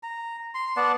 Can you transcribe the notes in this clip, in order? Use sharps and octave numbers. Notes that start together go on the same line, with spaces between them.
A#5
C6
B3 D5 F#5 A5